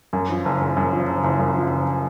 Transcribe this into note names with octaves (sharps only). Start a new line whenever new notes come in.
F#2
F3
F#1
F#1
F#2
F3
F#1
F#1
F#2
F3
F#1